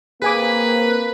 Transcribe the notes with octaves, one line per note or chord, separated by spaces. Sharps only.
A#3 C4 G#4 B4 G#5 D6